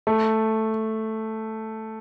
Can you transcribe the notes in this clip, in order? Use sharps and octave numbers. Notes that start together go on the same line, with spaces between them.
A3